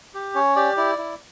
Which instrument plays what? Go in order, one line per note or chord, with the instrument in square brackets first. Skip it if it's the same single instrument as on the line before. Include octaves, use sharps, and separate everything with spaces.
[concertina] G4
C#4 C#5
G4 D5
E4 D5
E4